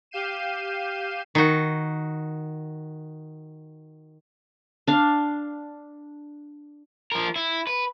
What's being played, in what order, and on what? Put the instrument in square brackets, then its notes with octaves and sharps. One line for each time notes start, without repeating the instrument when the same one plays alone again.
[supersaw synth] G4 F5 G6 C7 D#7 E7
[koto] D#3 F#4
[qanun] D4 F5
[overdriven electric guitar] F3 A#4
E4
B4